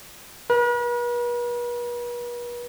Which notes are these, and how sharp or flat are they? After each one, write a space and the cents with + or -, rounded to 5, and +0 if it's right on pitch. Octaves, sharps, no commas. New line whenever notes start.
B4 -45